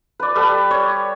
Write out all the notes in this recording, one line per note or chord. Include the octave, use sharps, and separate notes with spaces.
B4 D5
G3 A4 B4
C#5